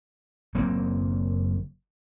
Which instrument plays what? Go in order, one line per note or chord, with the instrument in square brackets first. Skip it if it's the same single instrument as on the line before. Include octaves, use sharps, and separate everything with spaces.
[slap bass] F#1 F#3 A#3 C4